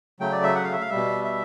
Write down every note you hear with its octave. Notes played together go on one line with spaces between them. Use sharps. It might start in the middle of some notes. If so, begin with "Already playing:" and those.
C#3 F#3 A3 G5
D5
E5
F#5
F5
E5
F5
B2 G3 E5
E5